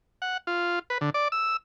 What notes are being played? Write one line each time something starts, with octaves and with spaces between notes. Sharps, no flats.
F#5
F4
B4
D3
D5
E6